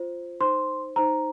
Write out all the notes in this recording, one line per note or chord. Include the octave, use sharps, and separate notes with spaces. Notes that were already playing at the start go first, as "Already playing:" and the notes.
Already playing: F4 C5
D#4 C5 C6
D#4 C5 A#5